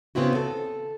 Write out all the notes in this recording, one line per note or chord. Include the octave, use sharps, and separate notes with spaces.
C#3 B3 C4 E4 F#4
A4